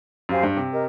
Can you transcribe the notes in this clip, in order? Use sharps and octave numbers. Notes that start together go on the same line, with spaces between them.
F#2 G4 C5 F5 G#5
G2
C3
G4 A#4 D#5